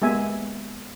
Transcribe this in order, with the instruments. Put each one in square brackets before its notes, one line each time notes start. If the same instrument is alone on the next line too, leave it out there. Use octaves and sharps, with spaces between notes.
[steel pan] G#3 A#3 B3 G4 E5 G#5